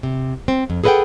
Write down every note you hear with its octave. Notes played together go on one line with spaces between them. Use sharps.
C3
C4
F2
G#4 A4 B4 D#5 F#5 G5